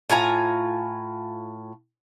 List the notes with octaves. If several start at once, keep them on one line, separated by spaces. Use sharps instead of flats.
A2 F4 G#5 A#5